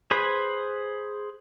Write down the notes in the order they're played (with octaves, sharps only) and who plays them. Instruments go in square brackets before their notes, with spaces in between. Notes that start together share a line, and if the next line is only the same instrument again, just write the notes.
[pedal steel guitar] G#4 B4 C5 B5